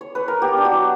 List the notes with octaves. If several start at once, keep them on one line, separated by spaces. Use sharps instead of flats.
C#5
B4
A#4
B3 G4
D4
F#4
F#3